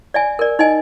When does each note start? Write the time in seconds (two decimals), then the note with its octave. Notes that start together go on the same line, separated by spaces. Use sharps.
0.14 D5 E5 G#5
0.39 A#4 D5
0.59 D#4 D#5 G#5